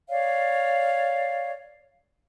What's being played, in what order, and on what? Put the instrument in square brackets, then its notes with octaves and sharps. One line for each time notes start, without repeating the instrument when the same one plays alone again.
[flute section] C#5 D5 F5